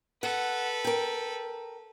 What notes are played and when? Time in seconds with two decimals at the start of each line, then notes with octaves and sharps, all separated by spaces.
0.23 A4 B4 F#5
0.84 A#4 G5